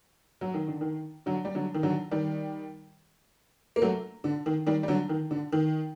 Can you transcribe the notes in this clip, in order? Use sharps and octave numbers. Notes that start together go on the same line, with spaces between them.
F#3
D#3
D3
D#3
D3 F#3
G3
D3 F#3
D#3
D3 F#3
D#3 G3
A#3
F#3 A3
D3
D#3
D#3 G3
G3
D3 F#3
D#3
D3
D#3